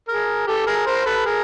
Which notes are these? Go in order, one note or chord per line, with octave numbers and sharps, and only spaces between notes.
G#4 A#4
G4 A4
G#4 A#4
A#4 C5
A4 B4
G#4 A#4